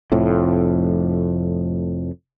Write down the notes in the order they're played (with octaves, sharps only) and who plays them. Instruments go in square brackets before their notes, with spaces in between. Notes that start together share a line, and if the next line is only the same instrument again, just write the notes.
[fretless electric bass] F1 F2 A2